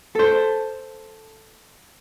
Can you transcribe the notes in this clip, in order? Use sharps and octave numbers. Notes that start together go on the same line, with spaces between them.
A4 C5